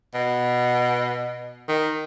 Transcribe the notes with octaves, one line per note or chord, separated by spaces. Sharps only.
B2
D#3